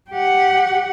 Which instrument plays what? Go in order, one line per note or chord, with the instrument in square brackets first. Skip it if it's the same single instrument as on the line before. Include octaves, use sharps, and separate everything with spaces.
[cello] G4 F#5